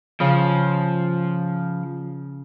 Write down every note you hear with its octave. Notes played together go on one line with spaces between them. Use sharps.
C#3 F3